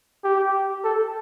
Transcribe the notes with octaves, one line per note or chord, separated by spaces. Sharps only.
G4
A4